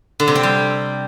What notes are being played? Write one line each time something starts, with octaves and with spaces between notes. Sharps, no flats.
D3
C3
C4
G3